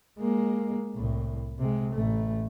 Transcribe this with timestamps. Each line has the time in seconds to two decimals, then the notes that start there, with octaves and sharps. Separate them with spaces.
0.19 G#3 A#3
0.96 C2 A2
1.59 C3 G#3
1.94 A1 A3